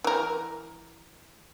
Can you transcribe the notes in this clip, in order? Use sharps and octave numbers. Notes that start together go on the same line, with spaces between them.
E3 A#4